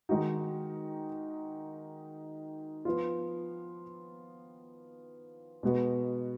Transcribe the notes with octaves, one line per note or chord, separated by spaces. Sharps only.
D#3 G#3 D#4 F#4
F3 B3 F4
B2 G#3 B3 F#4